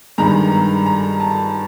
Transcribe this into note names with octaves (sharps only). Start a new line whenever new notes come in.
G2 D#3 G#3 A#5
A#5
A5